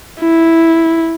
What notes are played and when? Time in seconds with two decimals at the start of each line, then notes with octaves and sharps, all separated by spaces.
0.21 E4